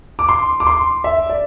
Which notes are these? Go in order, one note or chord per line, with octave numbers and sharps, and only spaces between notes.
D6
C6
D6
C6
E5
D5